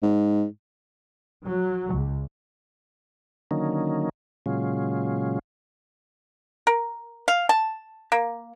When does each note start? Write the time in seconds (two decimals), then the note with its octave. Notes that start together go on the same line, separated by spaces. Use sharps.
0.03 G#2
1.47 F#3
1.94 C#2
3.51 D3 D#3 F#3 A#3 C#4 D#4
4.46 A#2 C#3 F#3 G#3 C#4 F4
6.67 A#4
7.28 F5
7.49 A5
8.12 A#3